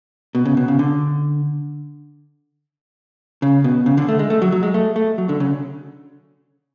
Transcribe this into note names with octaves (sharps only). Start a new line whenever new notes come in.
B2
C#3
B2
C#3
D3
C#3
B2
C#3
D3
A3
G#3
A3
F#3
F#3
G#3
A3
A3
F#3
D3
C#3